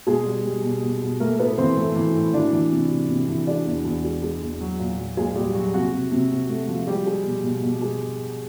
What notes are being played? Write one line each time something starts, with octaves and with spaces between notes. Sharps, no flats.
B2 G#3 G#4
G3
G3
B2
B2
B2
A3 A#3 A#4
A2 B3 B4
E3 C4 C5
A3
E3
A2
E3 D4 D5
E3
C3
C3
C3
E3
G#3 D4 D5
E2
E2
G#3
G#3
E2
F#3
A#2
F#3
A#2 G#3 G#4
A#2 G3 G4
F#3 F#4
C3 F#4
C3
C3
C3
A3
F3
G3 G#3 G4
G#3
B2
B2
B2
G#3